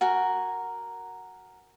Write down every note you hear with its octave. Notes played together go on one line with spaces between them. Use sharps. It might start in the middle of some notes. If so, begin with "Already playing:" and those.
F#4 A#4 G#5